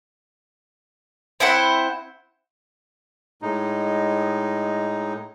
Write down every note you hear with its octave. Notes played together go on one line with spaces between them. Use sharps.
C4 E4 C5 F#5
A2 G#3 D#4